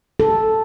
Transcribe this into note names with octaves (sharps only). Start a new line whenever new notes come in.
A4